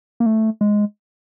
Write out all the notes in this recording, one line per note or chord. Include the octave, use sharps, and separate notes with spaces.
A#3
A3
G#3